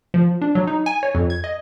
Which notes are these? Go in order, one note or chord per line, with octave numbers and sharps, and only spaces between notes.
F3
D4
F#3
D#4
G#5
C#5
F2
G#6
D#5